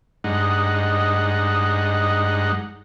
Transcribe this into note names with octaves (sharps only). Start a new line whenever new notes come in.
G2 G#3 D#4 F#5